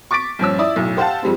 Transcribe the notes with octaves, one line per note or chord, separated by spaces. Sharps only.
C#6 D6 A6 B6 D7
G2 A#2 F3 C#4 E6
E4 D5 D#6
B1 F#2 A2
G4 C5 F5 F#5 A5
F2 G3 G#3 C4